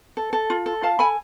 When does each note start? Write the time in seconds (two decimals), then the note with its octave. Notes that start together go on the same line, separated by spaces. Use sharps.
0.17 A4
0.33 A4
0.50 F4
0.66 A4
0.82 F4 F5 A5
0.99 A4 G#5 B5